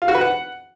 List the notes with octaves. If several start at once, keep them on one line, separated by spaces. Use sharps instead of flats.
F4
F#4
B4
F#5